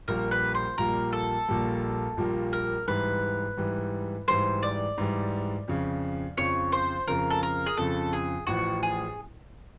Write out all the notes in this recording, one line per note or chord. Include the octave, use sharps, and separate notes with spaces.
A#1 A#2 G3 A#3 A#4
B4
C5
A#1 A#2 G3 A#3 A#4
A4
A#1 A#2 G3 A#3
A#1 A#2 G3 A#3
A#4
G#2 E3 G3 B4
G#2 E3 G3
G#2 E3 G3 C5
D5
G#2 E3 G3
F2 C#3 F3
F2 C#3 F3 C#5
C5
F2 C#3 F3 A#4
A4
A#4
G#4
F2 C#3 F3 A4
G#4
A1 A2 F3 F#4
G#4